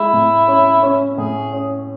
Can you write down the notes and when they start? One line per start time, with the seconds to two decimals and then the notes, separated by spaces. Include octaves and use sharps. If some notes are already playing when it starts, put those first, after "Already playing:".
Already playing: G#3 E4
0.13 A2
0.48 C#4
0.83 C#4
1.18 A2 G#4
1.53 C#4